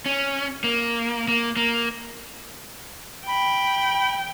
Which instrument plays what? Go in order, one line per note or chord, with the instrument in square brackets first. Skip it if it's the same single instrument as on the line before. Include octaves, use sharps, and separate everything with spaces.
[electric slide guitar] C#4
A#3
A#3
A#3
[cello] G5 [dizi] B5